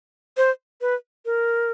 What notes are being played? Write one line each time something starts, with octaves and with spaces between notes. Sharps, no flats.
C5
B4
A#4